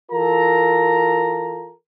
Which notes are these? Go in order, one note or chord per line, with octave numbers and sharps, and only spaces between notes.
E3 F4 A4 A#4 A#5